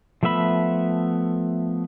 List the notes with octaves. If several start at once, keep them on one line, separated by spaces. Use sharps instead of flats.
F3 A3 B3 E5 B5